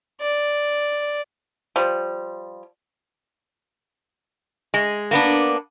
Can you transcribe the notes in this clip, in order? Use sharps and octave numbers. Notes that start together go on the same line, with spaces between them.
D5
F3 G3
G#3
A#3 B3 D4